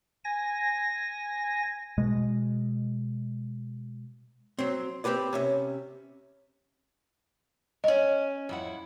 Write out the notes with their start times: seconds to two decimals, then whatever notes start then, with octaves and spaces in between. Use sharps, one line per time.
0.25 G#5 A#6
1.98 B2 G#3
4.59 F#3 C4
5.04 C4 D4 G4 B4 D5
5.33 C3 C#4 E5
7.84 C#4 C#5 D#5
8.49 F2 E4 F#5